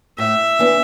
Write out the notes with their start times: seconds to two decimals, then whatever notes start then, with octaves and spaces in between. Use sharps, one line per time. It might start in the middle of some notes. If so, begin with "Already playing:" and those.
0.18 A2 E5
0.59 E3 B3 D4